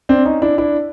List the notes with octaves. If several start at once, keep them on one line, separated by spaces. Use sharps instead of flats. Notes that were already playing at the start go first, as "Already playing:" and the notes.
C4 D4
C#4 D#4
D4 E4
D4 E4